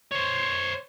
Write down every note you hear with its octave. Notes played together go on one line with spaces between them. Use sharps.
C5 C#5